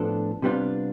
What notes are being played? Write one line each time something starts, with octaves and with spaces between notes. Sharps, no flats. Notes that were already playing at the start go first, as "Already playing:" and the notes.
Already playing: A2 F3 B3 D4 A4
C3 G3 B3 D4 F4